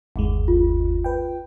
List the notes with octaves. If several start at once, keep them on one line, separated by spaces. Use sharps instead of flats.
G1 D#2 G#3
F4
B4 G5